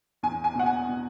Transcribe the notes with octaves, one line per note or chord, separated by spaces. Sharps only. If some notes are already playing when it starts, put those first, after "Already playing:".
E2 G#5
G#5
B2 F#5
G#5
B2